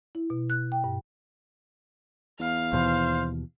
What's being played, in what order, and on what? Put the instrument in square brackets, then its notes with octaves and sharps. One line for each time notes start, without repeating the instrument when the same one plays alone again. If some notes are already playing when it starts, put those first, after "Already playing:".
[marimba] E4
B2
F#6
G5
G2
[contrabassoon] E2 [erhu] F5
[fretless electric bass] D#2 B2 E3 [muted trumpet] C5